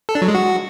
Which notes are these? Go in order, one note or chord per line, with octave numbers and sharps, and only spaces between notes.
A4
D4
F#3
G#3
F#4